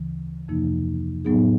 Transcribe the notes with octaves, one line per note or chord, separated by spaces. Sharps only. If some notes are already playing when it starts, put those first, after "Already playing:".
Already playing: D2 C#3 E3
F2 C3 F3 A#3 D#4
A2 F#3 B3 D#4 G#4